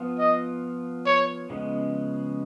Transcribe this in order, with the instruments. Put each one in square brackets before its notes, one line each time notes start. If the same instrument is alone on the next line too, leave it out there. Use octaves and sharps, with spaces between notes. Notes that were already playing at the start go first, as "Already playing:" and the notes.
Already playing: [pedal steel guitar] F3 B3 F4
[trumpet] D#5
C#5
[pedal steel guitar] C#3 F3 G#3 B3